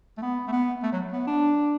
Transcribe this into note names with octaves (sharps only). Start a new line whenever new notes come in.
A3
B3
A3
B3
A3
F#3
B3
D4